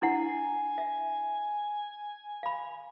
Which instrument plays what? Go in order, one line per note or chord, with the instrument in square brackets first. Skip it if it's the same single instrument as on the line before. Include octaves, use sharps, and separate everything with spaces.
[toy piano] D4 E4 F#5 [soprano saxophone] G#5
[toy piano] E5
F5 B5